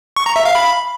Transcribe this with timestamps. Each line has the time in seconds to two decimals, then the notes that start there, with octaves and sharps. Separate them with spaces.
0.16 C#6
0.26 A#5
0.36 E5
0.45 F5
0.55 B5